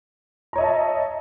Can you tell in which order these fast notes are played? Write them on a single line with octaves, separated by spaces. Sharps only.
A#5 C#5 D#5 E5 A5